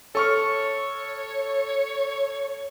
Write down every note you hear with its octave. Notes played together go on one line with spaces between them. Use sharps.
A4 C#5 C#6 F6